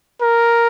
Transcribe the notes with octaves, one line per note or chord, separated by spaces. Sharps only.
A#4